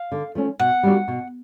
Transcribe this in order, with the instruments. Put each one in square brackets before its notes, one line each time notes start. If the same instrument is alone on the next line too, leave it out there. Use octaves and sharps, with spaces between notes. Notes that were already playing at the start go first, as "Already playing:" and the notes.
Already playing: [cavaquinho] F5
[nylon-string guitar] D3
F3 A3 C#4
[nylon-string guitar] B2 [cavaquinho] F#5
[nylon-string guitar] G3 A#3 D4 F#4
B2